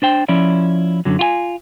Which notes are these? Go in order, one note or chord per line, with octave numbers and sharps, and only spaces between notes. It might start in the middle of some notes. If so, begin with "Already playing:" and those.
D4 C5 G5
F3 C#4 E4 D5
F#2 D3 F#3
F4 F#4 G#5